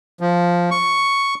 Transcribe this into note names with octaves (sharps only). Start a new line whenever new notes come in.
F3
C#6